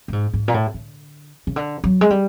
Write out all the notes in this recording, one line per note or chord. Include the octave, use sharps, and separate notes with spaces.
A2
G#2
G#2
A#2
A2
D3
C#3
D3
F#3
G#3
G3